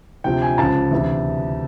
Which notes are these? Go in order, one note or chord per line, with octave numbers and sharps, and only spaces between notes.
D2 C3 F3 G5
G#5
C#2 C#3 F3 A5
D2 C3 E3